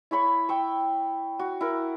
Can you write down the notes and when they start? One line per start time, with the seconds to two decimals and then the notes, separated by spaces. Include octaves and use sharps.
0.11 E4 C#5 B5 C#6
0.49 G5 C#6 E6
1.39 F#4
1.61 E4 A#4